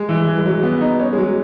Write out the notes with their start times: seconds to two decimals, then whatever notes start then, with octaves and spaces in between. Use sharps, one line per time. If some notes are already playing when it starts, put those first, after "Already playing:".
Already playing: G#3
0.09 E3
0.27 E3
0.38 G#3
0.46 F#3
0.63 B3
0.81 D#4
1.00 C#4
1.13 G#3
1.18 F#3